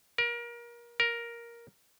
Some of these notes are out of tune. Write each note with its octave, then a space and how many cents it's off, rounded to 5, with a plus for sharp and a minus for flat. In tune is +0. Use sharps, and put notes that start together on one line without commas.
A#4 +30
A#4 +10